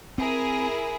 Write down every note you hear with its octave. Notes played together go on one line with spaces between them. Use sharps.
C4 E4 G#4 A#4